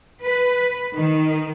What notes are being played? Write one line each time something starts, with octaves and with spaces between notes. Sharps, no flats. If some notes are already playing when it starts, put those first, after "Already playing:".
B4
D#3